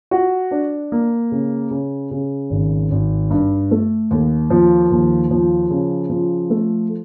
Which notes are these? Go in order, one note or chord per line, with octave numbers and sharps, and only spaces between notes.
F#4
D4
A#3
C#3
C#3
C#3
G#1
G#1
G2
A3
D#2
F3
D#2
F3
C#3
F3
A3